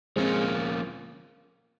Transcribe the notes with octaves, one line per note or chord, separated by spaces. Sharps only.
F3 G#3 A#3 C4 C#4 F4